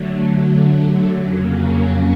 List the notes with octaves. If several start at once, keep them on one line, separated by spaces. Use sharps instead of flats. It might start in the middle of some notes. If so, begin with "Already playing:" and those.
Already playing: D3 F#3 A3
F2 C#3 F#3 A#3 C#4